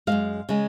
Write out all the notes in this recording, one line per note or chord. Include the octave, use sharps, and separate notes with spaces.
F#2 F3 G#3 F5
C#3 G#3